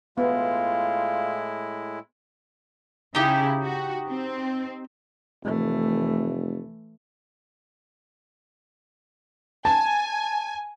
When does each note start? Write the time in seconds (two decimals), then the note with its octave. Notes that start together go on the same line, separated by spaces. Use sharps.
0.18 A2 G#3 B3 E4 F4
3.15 C#3 D#4 E4 G4
3.62 F#4
4.09 C4
5.44 F1 E3 A3
9.65 G#5 A5